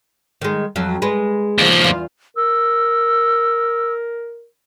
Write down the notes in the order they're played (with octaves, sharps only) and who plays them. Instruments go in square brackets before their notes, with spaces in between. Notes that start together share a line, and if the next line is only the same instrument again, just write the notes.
[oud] D#3 G#3
F2 F#3
G#3 B4
[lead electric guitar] D#2 F3
[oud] E2 F4
[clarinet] A#4 [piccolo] E6